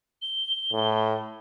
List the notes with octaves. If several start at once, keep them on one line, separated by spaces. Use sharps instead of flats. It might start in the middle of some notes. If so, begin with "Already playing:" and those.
G7
A2